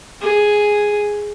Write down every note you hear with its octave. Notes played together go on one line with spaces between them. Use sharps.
G#4